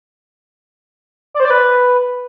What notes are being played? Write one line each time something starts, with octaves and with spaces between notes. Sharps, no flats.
D5
C5
D5
B4